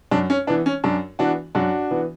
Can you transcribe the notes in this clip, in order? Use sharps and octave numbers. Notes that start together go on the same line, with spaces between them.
F#2 D4
C#4
E3 B3 D4
C#4
F#2 D4
E3 B3 D4 F#4
F#2 D4 F#4
E3 B3